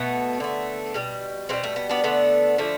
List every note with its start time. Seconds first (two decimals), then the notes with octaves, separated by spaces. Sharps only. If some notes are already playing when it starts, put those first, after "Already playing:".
Already playing: B2 A3 B3
0.40 D3 A3
0.94 B2 G3
1.49 B2 A3 C4
1.53 G3
1.64 A3
1.76 B3
1.89 B3 D4
2.04 D3 A3 B3 D4
2.58 D3 F3 A3